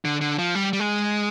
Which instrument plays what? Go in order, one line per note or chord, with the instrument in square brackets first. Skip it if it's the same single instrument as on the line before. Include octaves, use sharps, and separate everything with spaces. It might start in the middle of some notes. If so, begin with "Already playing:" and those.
[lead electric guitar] D3
D3
F3
G3
G3
G#3